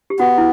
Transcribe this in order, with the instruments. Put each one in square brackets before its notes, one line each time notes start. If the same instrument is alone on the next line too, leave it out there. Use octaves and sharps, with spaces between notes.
[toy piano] G4
[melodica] B3 [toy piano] F#4
[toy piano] E4